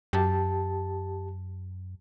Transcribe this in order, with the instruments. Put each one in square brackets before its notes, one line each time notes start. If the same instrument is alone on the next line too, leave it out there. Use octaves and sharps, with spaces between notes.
[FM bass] F#2 [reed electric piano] G4 A5